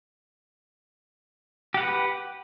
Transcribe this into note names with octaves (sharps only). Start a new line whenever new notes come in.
G4 B4 F#5